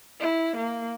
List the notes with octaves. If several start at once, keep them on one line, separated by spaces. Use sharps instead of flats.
E4
A#3